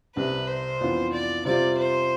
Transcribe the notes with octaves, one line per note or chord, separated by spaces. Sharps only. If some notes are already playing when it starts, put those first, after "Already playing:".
C2 C3 G3 B4
C5
F2 E3 B3 D4 F4
D5
C3 G3 C4 F4 D5
C5